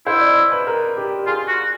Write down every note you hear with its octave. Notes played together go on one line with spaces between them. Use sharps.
E4 C5
D5
D#5
B4
A#4
G4
F4 G#4
F#4